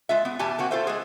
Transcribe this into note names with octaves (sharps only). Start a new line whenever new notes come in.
G#3 F4 E5
B3
E2 B2 G4 G#5 A5
A#3 C4 F#4
F4 A4 C5 E5
G#3 G#4